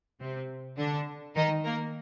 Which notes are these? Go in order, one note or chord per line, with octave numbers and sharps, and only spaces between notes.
C3 C4
D3 D4
D#3 D#4
A#3 A#4